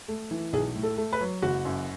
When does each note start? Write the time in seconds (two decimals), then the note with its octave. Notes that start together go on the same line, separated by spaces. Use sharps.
0.08 A3
0.31 E3
0.53 B1 G#4
0.75 A2
0.83 A4
0.98 A3
1.13 B4
1.21 F#3
1.42 F#1 F#4
1.65 F#2